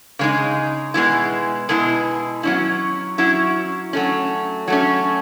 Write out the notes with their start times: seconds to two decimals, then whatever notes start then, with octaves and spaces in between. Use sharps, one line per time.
0.19 C#3 G#3 D#4
0.94 B2 G#3 B3 E4
1.69 B2 G#3 B3 E4
2.43 F#3 C#4 E4
3.18 F#3 C#4 E4
3.93 F#3 A3 C#4
4.68 F#3 A3 C#4